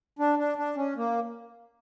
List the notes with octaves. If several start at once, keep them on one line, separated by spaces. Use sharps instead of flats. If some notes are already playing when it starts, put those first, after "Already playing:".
D4
D4
D4
C#4
A#3